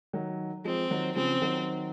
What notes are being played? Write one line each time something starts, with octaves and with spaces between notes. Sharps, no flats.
D#3 F#3
F3 G#3 C4
D#3 F#3
C#3 F3 C4
D#3 F#3